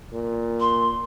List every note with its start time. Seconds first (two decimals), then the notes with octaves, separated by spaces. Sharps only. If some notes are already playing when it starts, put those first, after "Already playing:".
0.13 A#2
0.60 C6